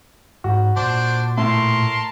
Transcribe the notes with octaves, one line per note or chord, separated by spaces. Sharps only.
G#2 F#4
A#2 D4 C5 D5
A2 A#4 A5 C6